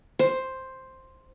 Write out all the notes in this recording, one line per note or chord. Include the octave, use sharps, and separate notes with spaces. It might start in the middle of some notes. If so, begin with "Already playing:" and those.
C5